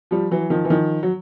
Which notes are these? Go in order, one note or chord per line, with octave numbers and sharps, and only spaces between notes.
F3 G3
E3 F#3
D#3 F3
E3
D#3 F3
F#3